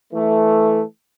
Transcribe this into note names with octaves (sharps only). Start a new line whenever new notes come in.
E3 A3